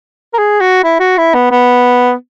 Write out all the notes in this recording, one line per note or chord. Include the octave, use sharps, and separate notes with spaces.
A#4
G#4
F#4
E4
F#4
E4
B3
B3